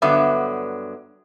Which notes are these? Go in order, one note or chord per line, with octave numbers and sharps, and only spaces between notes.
G2 D3 F#3 B3 E5